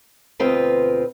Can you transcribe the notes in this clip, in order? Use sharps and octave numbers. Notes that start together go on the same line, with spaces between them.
D2 B2 C4 F4 B4 D#5